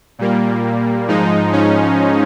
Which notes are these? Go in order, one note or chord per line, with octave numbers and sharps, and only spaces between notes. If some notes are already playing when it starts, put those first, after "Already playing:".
A#2 G3 A#3
G#2 F3 G#3 D#4
C#4